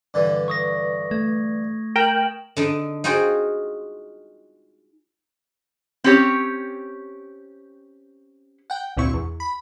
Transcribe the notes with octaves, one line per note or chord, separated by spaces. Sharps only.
G2 D3 E3
C#6 D#6 A#6
A3 G#6
A#4 G5 E7 F#7
D3 D4 D#4
D#4 F4 F#4 G#4 C5 G5
C4 C#4 G4 C#5
F#5 G5
G#1 D2 A#2 C4 E4 C#6
E2
B5